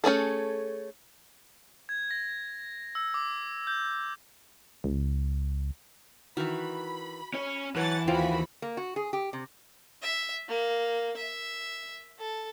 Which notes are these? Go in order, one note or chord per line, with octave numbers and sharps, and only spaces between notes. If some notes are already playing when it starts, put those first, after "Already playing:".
A3 C#4 G#4 A4
G#6
A#6
E6
D6
G6
C#2
D#3 E3 F#4 B5
C#4 C#5
E3 F#3 B4 C#5 F#5 A5 A6
D#2 F3 F4 F#4 F5 G5 B5
A#3
F#4
G#4
G4
C3
E5
A#3
E5
A4